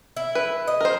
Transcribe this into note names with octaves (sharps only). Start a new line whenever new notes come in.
E4
B4
D#5
A#4 C5